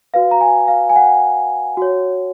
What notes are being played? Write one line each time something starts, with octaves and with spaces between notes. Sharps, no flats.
F#4 B4 F5
A#5
G#5
F5
G#5
F#5
F#4 C#5